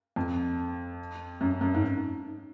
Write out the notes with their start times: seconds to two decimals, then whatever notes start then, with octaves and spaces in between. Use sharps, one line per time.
0.16 F2
1.41 F#2
1.61 F#2
1.74 G#2